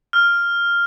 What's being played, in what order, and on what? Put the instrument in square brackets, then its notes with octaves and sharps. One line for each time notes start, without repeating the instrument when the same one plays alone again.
[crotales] F6